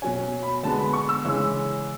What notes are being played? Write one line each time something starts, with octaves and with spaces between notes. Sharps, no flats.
B2 F#3 C#4 G#5
B5
D3 G#3 B3 A5
B5
C#6
E6
C#3 E3 G#3 C#4 E6